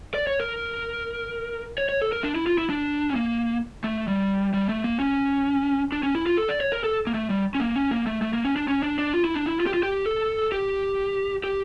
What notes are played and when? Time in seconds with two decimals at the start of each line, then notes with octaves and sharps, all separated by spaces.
0.14 D5
0.27 C#5
0.39 A#4
1.78 C#5
1.89 C#5
2.02 A4
2.12 A#4
2.24 D4
2.35 E4
2.47 F4
2.58 E4
2.70 D4
3.11 C#4
3.15 A#3
3.84 A3
4.08 G3
4.54 G3
4.69 A3
4.84 A#3
5.00 C#4
5.92 D4
6.03 C#4
6.15 E4
6.26 F4
6.37 A4
6.49 D5
6.61 C#5
6.72 A#4
6.84 A4
7.07 A#3
7.14 A3
7.30 G3
7.55 C#4
7.60 A#3
7.75 C#4
7.91 A#3
8.06 A3
8.22 A3
8.33 A#3
8.45 C#4
8.56 D4
8.68 C#4
8.83 D4
8.98 D4
9.14 F4
9.24 E4
9.35 D4
9.46 E4
9.60 F4
9.66 G4
9.74 F4
9.83 G4
10.06 A4
10.52 G4
11.44 G4